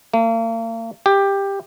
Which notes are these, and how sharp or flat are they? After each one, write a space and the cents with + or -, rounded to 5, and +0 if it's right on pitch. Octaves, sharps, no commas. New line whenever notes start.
A#3 -40
G4 +15